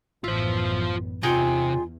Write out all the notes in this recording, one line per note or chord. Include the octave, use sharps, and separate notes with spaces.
A1 F#2 B3 F4 C5 E5
E2 C3 D#4 F4 G#4 G5